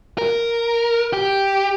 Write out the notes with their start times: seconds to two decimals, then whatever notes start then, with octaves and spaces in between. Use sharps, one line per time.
0.18 A#4
1.13 G4